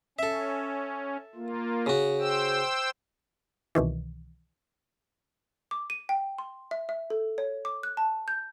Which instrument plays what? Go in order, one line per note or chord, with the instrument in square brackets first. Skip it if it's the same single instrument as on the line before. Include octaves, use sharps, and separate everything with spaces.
[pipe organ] C#4 [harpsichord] A4 E5
[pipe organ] A#3 F4
[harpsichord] C#3 F#4
[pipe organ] C5 G5 E6
[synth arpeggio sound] C2 B2 D#3 E3
[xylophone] D6
D#7
G5
C6
E5
E5
A4
C#5
D6
F#6
A5
G6